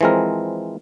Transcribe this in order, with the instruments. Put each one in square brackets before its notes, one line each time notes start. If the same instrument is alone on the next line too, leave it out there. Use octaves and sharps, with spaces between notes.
[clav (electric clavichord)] E3 F3 G#3 C4 A#4